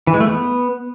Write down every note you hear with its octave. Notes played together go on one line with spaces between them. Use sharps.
E3
G#3
A3
B3